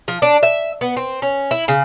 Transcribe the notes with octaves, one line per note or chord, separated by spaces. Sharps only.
F3
D4
E5
B3
C4
C#4
E4
C#3